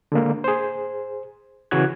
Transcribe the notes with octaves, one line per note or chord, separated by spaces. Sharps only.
D3 G#3 A#3
G#4 C5
C#3 E3 C#4 F#4 F#6 G#6